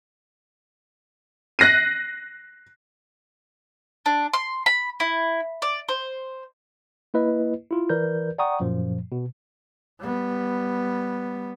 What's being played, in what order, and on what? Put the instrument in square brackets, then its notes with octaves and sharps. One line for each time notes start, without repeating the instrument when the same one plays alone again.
[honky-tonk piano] F#6 A#6 C7 D#7
[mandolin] D4
C6
B5
E4
D5
C5
[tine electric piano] A#3 E4 B4 D#5
E4 F4
E3 A#4 B4 D5 G6
D5 F#5 G5 A#5 C#6 D#6
F#2 A#2 F3
B2
[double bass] G3 B3